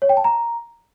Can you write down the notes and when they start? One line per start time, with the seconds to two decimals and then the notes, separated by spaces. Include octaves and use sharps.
0.02 C#5
0.09 G5
0.17 A5
0.24 A#5